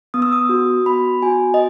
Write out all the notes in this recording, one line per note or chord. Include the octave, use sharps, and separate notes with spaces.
B3 D#6
E6
D#6
F#4
B3 B5
F#4 G#5
D#5